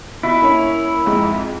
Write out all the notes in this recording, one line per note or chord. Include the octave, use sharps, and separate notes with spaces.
B2 E4
A#3 C#4 C#5
F2 G#2 G#3